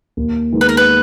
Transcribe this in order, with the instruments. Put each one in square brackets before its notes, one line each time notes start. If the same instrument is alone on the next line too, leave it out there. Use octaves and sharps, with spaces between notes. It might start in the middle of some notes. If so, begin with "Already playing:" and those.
[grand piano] D#2
D#3 G#3 B3 D#4
[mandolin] B4
A#4
B4